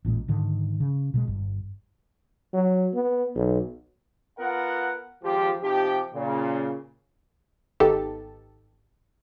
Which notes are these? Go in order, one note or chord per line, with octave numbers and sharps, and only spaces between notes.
A1 A#2 D#3 G#3
G#2 D3 D#3
C#3
B2 F#3 G#3
G1 G2
F#3
B3
B1
B3 F4 A#4 F#5
G#1 F3 G4
C3 F3 D#4 G4
A#2 C#3
G#1 B3 D#4 G4 A4 A5